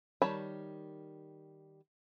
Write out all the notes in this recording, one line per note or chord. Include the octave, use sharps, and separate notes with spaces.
D#3 G3 C#5 A5 B5